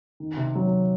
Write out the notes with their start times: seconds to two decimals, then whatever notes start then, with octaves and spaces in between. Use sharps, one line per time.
0.20 D#3
0.37 C3
0.55 F#3